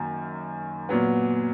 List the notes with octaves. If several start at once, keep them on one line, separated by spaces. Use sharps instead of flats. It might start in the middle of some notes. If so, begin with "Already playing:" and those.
Already playing: F#2 D#3 A#3
A#2 F#3 B3